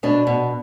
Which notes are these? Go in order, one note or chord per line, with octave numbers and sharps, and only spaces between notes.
B2 D4
B2